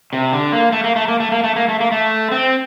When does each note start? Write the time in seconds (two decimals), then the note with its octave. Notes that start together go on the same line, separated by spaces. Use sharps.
0.13 C3
0.33 D3
0.52 A#3
0.72 A3
0.84 A#3
0.96 A3
1.08 A#3
1.20 A3
1.32 A#3
1.44 A3
1.56 A#3
1.68 A3
1.81 A#3
1.92 A3
2.31 C4